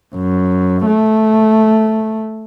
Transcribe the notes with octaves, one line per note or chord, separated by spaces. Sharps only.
F#2
A3